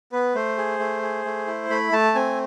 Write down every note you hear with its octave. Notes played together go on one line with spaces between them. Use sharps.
B3 B4
A3 C5
G#4
A3
G#4
A3
E4
A3 B5
A3 A5
C4 G#5